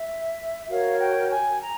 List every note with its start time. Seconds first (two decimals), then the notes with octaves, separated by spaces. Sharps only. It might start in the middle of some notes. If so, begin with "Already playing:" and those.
Already playing: E5
0.69 F#4 A#4 C#5 F5
1.00 G5
1.31 G#5
1.62 A#5